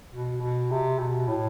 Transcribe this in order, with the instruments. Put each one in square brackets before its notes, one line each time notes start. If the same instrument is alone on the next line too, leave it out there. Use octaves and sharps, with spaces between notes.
[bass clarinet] B2
B2
C3
B2
A2